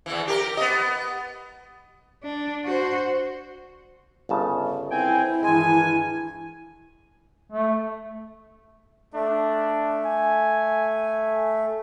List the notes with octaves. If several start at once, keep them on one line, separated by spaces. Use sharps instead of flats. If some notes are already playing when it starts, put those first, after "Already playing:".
E2 E3
G4 A#4
B3 D#5
D4
F#4 C5
G1 C#3 A5
C4 E4 G5 G#5
G2 D#3 E3 G#3 G#5
A3
A3 D4
G#5